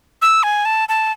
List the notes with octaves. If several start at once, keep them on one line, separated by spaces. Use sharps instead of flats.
E6
G#5
A5
A5